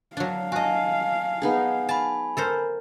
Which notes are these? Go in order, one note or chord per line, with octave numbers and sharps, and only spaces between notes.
F#3 D4 F5
F#4 D#5 G#5 A5
B3 D#4 G#4
G#5 A5 B5
A4 A#4 C5